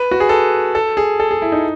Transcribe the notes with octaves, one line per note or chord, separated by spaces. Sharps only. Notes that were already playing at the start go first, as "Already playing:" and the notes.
Already playing: B4
F#4
G#4
A4
A4
G#4
A4
G#4
E4
D#4